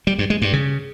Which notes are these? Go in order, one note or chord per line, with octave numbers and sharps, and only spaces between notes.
G3
G2
G#3
G2
C#3